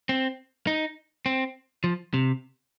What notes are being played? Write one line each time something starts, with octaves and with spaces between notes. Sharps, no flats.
C4
D#4
C4
F3
C3